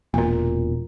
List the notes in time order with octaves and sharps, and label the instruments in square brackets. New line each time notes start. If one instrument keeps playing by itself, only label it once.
[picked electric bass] E1 A#2 [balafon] A#3